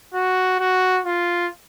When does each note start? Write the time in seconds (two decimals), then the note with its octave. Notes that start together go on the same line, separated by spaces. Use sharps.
0.14 F#4
0.59 F#4
1.06 F4